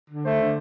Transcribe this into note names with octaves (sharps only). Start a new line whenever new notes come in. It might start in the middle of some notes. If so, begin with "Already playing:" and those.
D3
A3 C5
D3